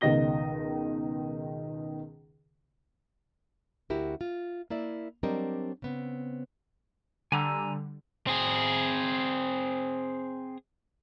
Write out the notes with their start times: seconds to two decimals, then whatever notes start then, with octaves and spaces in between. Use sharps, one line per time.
0.01 C#2 B2 D#3 D#5 A#6 G7
3.90 D2 E4 F#4 G4 A#4
4.21 F4
4.70 A#3 E4 D5 E5
5.23 F#3 G3 C4 D4 A#4 D#5
5.82 C#3 B3 C4
7.32 D3 G3 G#5 A#5 E6
8.27 C4 G#4